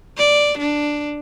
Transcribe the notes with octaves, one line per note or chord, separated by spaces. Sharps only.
D5
D4